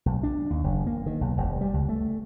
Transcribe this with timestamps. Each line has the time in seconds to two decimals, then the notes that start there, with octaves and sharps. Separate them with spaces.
0.06 B1
0.23 D4
0.51 D#2
0.64 F#1
0.87 A#3
1.06 D#3
1.21 B1
1.37 E1
1.61 G3
1.74 C#2
1.89 A3